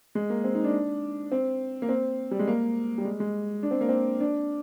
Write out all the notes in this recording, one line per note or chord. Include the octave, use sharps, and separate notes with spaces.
G#3
A#3
C4
D#4
D4
C4
A#3
C4
G3
G#3
A#3
G3
G#3
G#3
D4
C4
A#3
C4
D4